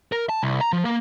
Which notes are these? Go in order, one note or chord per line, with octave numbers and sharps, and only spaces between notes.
A#4
A5
C2
A#5
F3
A#3